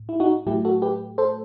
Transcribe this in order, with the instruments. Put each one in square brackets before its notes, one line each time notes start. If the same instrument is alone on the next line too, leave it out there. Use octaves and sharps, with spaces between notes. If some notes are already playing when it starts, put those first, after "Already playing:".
Already playing: [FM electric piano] A2
E4
D#4 F#4
A2 F#3 A3 E4 G4
F#4 A4
G4 B4
A4 C5